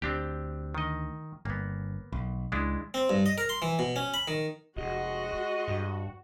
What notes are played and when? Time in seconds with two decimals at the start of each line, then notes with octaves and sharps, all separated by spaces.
0.02 D2 C4 D4 G4
0.75 D#3 D#5
1.45 G1 A#3 B3
2.13 B1
2.52 C#2 G#3 D4 E4
2.94 C4
3.09 G2
3.26 D#5
3.38 A#4
3.49 C6
3.62 E3
3.79 B2
3.96 C#4
4.14 B5
4.28 D#3
4.77 F1 G#3 F#4 D#5
5.68 G2